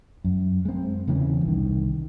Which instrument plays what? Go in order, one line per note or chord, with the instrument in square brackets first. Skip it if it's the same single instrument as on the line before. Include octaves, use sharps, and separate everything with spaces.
[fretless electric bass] F#2
G#3 C4
E2 C#3 E3 C#4
C2 D#3